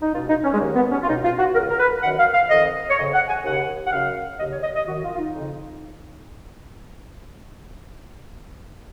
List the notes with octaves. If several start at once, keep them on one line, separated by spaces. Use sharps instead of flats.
D#4
C#2 B2 F4
D#4
C#4
G#3
D#2 D#3 A#3
B3
C#4
F4
C#2 B2 D#4
F4
F#4
C#2 C#3 A#4
A#4
B4
F#2 D#3 F#5
F5
F5
F2 D#3 D#5
C#5
F2 C#3 D#5
F#5
G#5
D#2 C#3 F#5
F#5
F#2 C#3 F5
D#2 C#3 D#5
C#5
D#5
D#5
F#2 D#3 F#4
F4
F4
D#4
F2 C#3